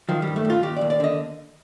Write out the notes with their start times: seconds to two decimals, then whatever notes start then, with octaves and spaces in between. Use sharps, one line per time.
0.09 D#3 F3
0.22 G3
0.27 G2
0.36 A3
0.45 G2
0.50 F4
0.63 D#2 G4
0.77 D5
0.81 D#2
0.90 D5
1.00 D3 D#5